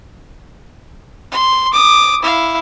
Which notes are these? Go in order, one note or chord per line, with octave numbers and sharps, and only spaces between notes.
C6
D6 D#6
E4 F5